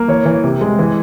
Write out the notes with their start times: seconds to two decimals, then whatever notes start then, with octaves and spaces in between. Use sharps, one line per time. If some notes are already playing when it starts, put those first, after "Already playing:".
Already playing: A#3
0.08 E3 C#5
0.26 E3
0.44 C3
0.61 G#3
0.79 E3